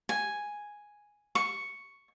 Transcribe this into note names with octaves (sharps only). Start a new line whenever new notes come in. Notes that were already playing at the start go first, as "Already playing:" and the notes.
G#5
C#6